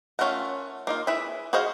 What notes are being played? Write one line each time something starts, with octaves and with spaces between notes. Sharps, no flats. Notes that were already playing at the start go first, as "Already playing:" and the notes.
A3 C#4 F4 A#4 F#5
A#3 D#4 F4
E4 G#4 B4 E5
F#4 G#4 C5 D#5 F5